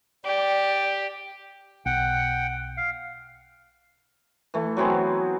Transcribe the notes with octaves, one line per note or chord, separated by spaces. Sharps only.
G4 D5
B1 F#5 G5
F5
E3 A3
F#3 B3 C4 G#4